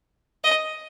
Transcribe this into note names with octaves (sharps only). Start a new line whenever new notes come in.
D#5